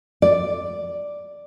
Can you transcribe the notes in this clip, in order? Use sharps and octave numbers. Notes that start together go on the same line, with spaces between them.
D5